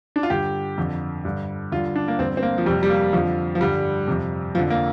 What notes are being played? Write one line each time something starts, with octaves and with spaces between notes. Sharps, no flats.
D4
F4
G2 D3 G4
F2 D3
G2 D3
G2 D3 F4
D4
A#3
G2 D3 C4
C4
A#3
F3
F2 C3 G3
G3
A#3
F2 D3 F3
F3
G2 D3 G3
F2 C3
F2 D3 F3
A#3